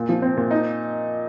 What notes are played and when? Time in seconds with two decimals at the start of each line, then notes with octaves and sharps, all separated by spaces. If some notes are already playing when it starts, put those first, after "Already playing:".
Already playing: A#2
0.09 F3
0.22 C4
0.37 A#2
0.51 D#4